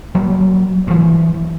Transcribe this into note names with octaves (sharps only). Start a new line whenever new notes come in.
F#3 G3 A#3
G2 E3